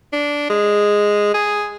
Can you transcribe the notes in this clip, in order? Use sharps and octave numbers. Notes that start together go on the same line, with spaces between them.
D4
G#3
G#4